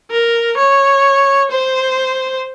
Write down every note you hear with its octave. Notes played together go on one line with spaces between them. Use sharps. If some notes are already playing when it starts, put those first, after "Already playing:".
A#4
C#5
C5